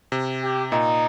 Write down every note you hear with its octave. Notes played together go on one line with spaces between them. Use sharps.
C3
G4
A#2 D#4